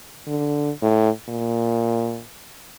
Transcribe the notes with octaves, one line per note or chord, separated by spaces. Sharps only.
D3
A2
A#2